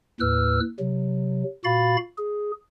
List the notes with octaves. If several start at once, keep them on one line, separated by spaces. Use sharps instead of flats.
D#2 A2 B4 E6 F6
C3 F#3
A#2 F#4 F5 B5 A6
G#4